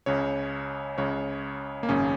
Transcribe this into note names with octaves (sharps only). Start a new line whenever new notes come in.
C#2 C#3 C#5
C#2 C#3 C#5
A#3
G#1 F#2 C#3 C#4